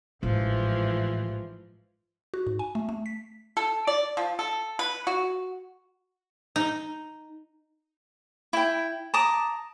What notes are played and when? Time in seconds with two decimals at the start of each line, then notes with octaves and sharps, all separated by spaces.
0.23 A1 G#2 E3 F3
2.34 F#4
2.47 G#2
2.59 G#5
2.75 A3
2.89 A3
3.06 B6
3.57 A4
3.87 D5
4.17 F3
4.39 A4
4.79 B4
5.07 F#4
6.56 D#4
8.53 E4 G5
9.14 A5 A#5 D6 D#6